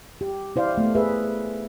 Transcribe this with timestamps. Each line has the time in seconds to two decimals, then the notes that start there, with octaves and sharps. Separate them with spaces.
0.21 G4
0.56 E4 C5 D5 F5
0.78 A3 B3
0.95 G#4 B4 E5